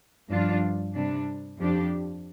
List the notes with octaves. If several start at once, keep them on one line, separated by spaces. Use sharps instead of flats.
G2 F3 D4 F4
C3 G3 D4
F2 F3 D4 G4